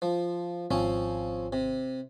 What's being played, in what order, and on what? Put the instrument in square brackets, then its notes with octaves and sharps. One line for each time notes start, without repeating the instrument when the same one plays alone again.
[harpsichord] F3
[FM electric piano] G#1 [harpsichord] F3 C4 C#4
[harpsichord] C3